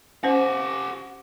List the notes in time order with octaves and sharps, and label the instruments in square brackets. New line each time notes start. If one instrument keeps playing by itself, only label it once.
[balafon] C#4 C5 [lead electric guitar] G4 F#5